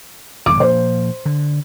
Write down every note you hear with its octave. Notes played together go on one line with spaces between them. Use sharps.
G#1 F2 G#2 D6
A#2 F3 A#3 C5
D3